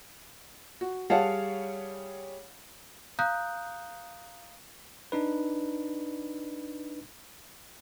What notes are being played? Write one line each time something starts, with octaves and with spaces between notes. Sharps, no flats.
F#4
G3 G#4 C#5 F5 F#5 A5
F5 A#5 D#6 F#6 G6
D4 D#4 B4